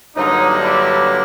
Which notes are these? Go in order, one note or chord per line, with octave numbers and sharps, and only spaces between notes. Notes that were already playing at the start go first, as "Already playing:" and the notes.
G2 D3 F#3 A#3 D#4
D4 E4